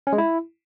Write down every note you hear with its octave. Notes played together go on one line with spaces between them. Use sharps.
C#4
G#3
E4